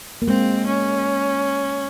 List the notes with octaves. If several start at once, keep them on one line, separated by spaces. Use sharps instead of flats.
A#3
G#3 C4
C#4